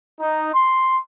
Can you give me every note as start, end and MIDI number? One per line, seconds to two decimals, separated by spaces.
0.20 0.49 63
0.54 0.97 84